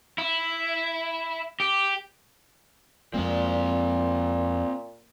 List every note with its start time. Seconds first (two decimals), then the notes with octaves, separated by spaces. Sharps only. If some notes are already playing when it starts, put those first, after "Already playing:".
0.18 E4
1.60 G4
3.14 F2 A#2 G#3 A#3 C4 D5